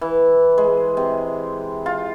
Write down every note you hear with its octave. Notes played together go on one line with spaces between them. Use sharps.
E3
G#3
C3
F4